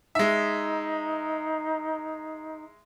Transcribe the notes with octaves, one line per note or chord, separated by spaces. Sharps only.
G#3 D#4 E5